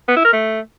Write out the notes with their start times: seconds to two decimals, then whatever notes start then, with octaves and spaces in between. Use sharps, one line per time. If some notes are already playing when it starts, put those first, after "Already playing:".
0.08 B3
0.16 E4
0.25 A#4
0.33 A3